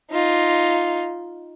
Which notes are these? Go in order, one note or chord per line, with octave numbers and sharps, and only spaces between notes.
D#4 F4